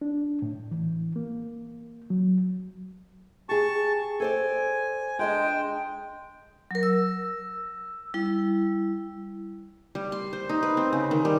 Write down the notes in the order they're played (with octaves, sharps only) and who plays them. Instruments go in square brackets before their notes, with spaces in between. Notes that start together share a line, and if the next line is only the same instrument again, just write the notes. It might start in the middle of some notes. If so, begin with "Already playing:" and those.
[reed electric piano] D4
A2
E3
A#3
F#3
[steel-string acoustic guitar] G4 G#4 [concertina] A5 C#6
[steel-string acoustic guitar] A4 C5 D5 [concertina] G#5
[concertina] G#3 G5 [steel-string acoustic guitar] D4 D#5 A5
[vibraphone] F#3 A#4
E6
G3 E4
[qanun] G3
C6
C5
D#4
B4
C4
C#3
D#3
G3